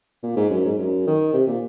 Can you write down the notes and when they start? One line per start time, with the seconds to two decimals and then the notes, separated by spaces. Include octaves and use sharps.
0.23 A#2
0.36 G#2
0.50 F#2
0.65 G#2
0.78 F#2
1.07 D#3
1.34 C3
1.47 A#2